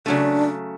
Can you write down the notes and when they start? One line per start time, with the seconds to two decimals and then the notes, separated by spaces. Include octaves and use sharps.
0.06 C#3 F#3 A3 D4